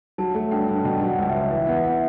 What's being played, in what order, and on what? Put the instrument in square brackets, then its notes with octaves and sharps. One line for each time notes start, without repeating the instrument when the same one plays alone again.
[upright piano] F#3 [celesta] A5
[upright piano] A3
[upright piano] G2 [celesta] G5
[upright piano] G2
[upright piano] B2 [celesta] G5
[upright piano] F#3
[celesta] F#5
[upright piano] C#2
[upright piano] C#2 [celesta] E5
[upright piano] E3 [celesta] E5
[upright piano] B3 [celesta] F#5
[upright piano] E4 [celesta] F#5